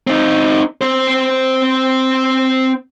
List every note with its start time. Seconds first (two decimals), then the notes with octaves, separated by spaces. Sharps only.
0.07 C4 D#4
0.81 C4 C5